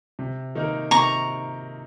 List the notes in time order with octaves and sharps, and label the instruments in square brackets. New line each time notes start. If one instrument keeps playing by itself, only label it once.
[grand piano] C3
D#3 A#3 D#4 A#4
[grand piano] C3 [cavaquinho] A#5 C#6